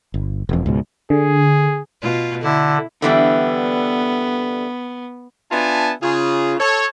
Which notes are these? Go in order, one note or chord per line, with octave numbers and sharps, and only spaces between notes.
G1
E1 F2
C#2 G#2 B2
D3 G#4
B2 F4
D3 E4
D3 E3 G3 B3
B3 D4 F4 E5 G#5 A5
C#3 F4 G#4
A4 C#5